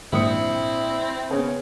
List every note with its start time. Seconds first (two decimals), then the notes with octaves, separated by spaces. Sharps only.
0.13 A#1 G#2 D#3 F#3 C4 E4 D#6 C#7
1.31 C#3 B3 C#4 G#4